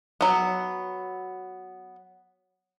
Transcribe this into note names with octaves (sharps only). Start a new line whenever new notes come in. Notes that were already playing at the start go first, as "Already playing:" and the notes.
F#3 B3